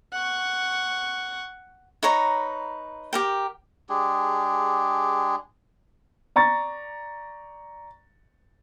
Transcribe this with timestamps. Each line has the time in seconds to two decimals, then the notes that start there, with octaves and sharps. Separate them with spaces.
0.13 F#5 C#6
2.03 D#4 B4 C#5 A#5
3.13 G4 A#4 G5
3.89 G#3 D4 G4 G#4
6.36 D5 A#5 C#6 A6